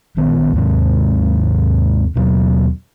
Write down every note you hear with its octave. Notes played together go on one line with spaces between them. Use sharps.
A#1 D#3 B3
D#2 G#2 C3
D#2 B2 F#3